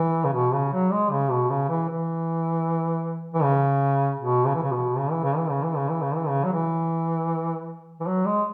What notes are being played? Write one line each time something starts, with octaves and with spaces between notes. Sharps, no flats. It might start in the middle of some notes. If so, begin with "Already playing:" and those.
Already playing: E3
C#3
B2
C#3
F#3
G#3
C#3
B2
C#3
E3
E3
E3
C#3
B2
C#3
E3
C#3
B2
C#3
E3
C#3
E3
C#3
E3
C#3
E3
C#3
E3
C#3
F#3
E3
E3
F#3
G#3